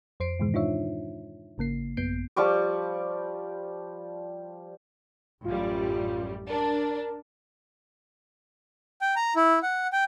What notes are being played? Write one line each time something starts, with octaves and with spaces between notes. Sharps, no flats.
F2 C5 C7 D7
G#2 B2 D#3 E3 G#3
D4 D#4 F4 C#5 E5
G#1 C#3 A#3 C7
A1 F#2 B3 G6 C7 D7
F3 G3 C#6 D6
A1 F#2 G3 F4
D4 A#4
G5
A#5
E4
F#5
G5